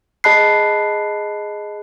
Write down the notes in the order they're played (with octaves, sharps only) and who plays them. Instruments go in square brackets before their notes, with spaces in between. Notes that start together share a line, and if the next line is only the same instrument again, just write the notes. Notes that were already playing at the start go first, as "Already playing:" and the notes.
[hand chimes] G#4 D#5 A5 B5 F#6 C7